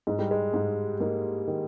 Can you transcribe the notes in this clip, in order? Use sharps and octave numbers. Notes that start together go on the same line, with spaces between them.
G#2 G#3
G3
G#3
G#2
G#2 A#3
D#3